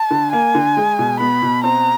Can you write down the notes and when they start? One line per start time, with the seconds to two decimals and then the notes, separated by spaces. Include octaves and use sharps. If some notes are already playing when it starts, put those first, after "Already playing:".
Already playing: A5
0.11 D3
0.33 A#3 G#5
0.55 D3
0.77 G#3
0.99 B2
1.20 B3 B5
1.42 B2
1.64 C4 A#5